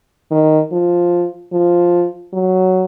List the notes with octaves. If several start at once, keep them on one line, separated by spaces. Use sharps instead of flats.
D#3
F3
F3
F#3